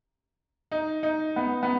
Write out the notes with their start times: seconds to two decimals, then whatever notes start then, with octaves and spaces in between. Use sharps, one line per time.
0.72 D#4
1.03 D#4
1.36 B3
1.63 B3